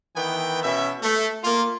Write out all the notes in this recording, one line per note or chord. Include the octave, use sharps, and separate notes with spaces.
D#3 E3 B3 G5
B2 C#4 E5
A3
A#3 F4